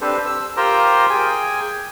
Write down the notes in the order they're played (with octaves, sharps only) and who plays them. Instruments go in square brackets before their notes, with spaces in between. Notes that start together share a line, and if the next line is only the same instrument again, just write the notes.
[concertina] C4 D4 G4 A4 B4 C5
E6
F4 G4 A#4 C5 G5 A#5
G#4 G5 G#5